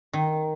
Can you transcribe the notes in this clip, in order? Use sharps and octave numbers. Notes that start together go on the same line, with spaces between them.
D#3